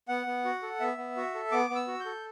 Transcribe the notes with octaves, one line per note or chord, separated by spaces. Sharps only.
B3 F#5
B3
F#4
A4
B3 E5
B3
F#4
A4
B3 D6
B3
E6
F#4
G6
A4